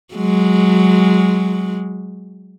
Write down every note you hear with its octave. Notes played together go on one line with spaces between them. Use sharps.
F#3 G#3